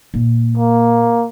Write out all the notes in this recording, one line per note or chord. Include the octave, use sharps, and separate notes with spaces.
A#2
A#3